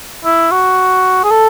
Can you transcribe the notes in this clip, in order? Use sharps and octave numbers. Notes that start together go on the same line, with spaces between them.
E4
F#4
G#4
A4